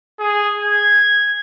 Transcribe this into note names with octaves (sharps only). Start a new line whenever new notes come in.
G#4
G#6